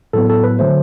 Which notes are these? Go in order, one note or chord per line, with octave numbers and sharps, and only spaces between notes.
A2 F#3 B3 A4
A4
B4
D3 F#3 A3 C5